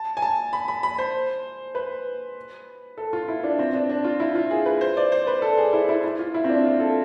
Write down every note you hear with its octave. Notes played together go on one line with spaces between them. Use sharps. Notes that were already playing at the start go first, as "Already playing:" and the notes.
Already playing: A5
G#5
A5
B5
B5
B5
C5
B4
A4
F4
E4
D4
C4
D4
D4
F4
E4
F4
G#4
B4
C5
D5
C5
B4
A4
G#4
E4
E4
E4
F4
E4
C4
D4
F4
A4